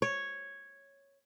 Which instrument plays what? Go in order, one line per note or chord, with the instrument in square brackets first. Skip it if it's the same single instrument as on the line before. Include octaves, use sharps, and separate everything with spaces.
[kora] C#5